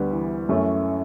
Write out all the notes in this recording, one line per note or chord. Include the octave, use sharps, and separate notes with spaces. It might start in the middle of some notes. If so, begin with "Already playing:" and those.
Already playing: D2 G3 B3
E3
F#2 A3 C#4